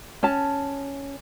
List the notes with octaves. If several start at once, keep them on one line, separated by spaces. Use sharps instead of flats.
C#4 A5